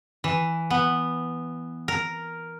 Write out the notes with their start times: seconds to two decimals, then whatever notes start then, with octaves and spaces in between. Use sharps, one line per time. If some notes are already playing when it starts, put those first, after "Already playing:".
0.24 E3
0.70 B3
1.88 A#4